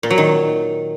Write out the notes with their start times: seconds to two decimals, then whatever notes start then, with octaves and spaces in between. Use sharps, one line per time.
0.03 A#2
0.10 F#3
0.18 D#3